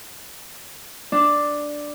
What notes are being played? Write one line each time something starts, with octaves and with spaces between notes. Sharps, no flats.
D4